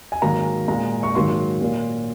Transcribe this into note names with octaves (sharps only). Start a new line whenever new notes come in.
G#5
G#2 D#3 F#3 A#3 A#5
A#2 G#3 A#5
C#6
G#2 D#3 F#3 A#3 C6
A#2 F#3 A#3